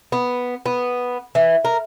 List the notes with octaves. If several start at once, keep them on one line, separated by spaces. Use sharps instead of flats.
B3
B3
E3
A#4